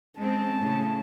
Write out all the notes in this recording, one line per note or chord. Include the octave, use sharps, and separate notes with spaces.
G#3 C4 C#4 A5
A2 C#3